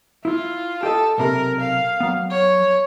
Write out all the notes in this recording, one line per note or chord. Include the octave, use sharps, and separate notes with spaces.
E4 F4
G4 A4 D#5
B1 C3 A#4 B5
F5
F#3 B3
C#5